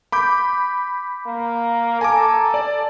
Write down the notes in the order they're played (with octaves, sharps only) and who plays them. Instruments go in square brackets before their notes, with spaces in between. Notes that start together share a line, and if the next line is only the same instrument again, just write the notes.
[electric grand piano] B5 D6 G6
[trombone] A#3
[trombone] A4 [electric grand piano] G#5 A#5 D6
[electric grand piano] D5